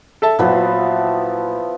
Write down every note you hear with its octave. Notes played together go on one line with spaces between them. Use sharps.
A4 E5 A5
A#2 F3 F#3 B3 E4